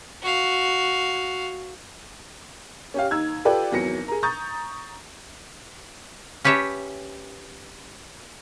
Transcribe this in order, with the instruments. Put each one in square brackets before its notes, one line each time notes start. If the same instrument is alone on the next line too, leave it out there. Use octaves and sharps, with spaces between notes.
[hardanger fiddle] F#4 F5
[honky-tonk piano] C#4 G4 F5
D#2 D#4 E6 G#6
F4 G4 A4 B4 D5 G5
G#1 E2 F#3 A#6 C#7
G#4 A#4
A#5 C#6 D#6 G6 A6
[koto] C#4 G4 B4 C#5 E5 A5